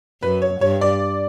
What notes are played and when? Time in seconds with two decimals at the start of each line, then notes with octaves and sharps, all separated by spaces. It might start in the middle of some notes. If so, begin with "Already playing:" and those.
0.23 F#2 B4
0.42 C#5
0.61 G2 C#5
0.81 D5